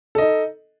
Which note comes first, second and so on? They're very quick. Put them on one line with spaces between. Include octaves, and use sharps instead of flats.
A4 D#5 D#4